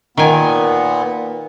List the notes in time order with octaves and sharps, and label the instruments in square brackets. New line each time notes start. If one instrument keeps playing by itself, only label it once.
[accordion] A#2 B3 [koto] D#3 G#5